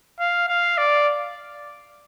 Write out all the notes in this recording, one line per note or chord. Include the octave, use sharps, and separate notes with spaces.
F5
F5
D5